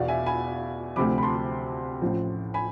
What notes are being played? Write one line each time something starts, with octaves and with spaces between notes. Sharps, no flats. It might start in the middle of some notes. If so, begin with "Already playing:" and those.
Already playing: E2 B2 D5 F5
E5 G#5
G#5 B5
D2 C3 F3 B5 D6
B5
A5 C6
A1 A2 F3
G#5 B5